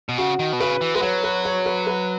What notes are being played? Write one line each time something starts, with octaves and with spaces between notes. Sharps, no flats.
B2
C#3 F#4
D#3
B2
C#3 B4
E3
G#3 B4
F#3 C#5
B4
C#5
B4
B4